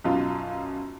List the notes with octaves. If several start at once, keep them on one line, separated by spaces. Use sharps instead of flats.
B1 F#2 F4